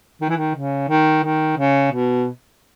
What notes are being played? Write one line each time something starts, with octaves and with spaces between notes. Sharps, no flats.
D#3
E3
D#3
C#3
D#3
D#3
C#3
B2